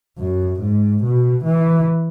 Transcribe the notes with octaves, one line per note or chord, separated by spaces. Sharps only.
F#2
G#2
B2
E3